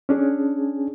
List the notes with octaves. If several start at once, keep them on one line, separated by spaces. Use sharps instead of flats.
C#4 D4 G#4